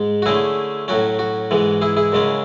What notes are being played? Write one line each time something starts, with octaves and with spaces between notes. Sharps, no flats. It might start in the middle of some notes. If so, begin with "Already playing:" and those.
Already playing: G#2 G#3
F#4
D3 A3 C#4 E4 G#4
A2 F#3 C#4 F#4
F#4
G#2 E3 G#3
E4 G#4
E4 G#4
F#2 C#3 G#3 C#4